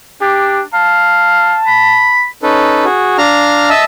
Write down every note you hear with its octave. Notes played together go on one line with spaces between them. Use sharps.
D4 G4
F5 A5
B5
C#4 D#4 A4 B4
F#4 G#4
D4 F5 A#5 F6
D#5 E5 A5 E6